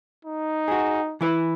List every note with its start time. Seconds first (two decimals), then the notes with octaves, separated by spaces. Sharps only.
0.25 D#4
0.68 F#4 G#4
1.21 E3 E4 B4